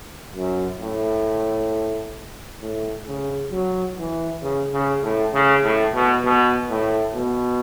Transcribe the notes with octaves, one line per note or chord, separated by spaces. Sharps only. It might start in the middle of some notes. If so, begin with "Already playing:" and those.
F#2
A2
A2
C#3
F#3
E3
C#3
C#3
A2
C#3
A2
B2
B2
A2
B2